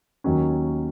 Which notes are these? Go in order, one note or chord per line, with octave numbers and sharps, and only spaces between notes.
D#2 D#3 F#3 C#4